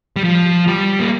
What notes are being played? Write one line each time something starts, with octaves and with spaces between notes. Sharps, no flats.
G3
F3
G3
A#3